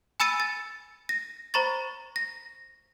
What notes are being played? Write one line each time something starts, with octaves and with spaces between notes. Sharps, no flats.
G#5 B5 E6 A6 C#7 D#7
A6
A#6
C5 A#5 B5 C#6 A6
A#6